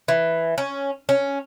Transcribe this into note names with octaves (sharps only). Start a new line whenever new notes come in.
E3
C#4
C#4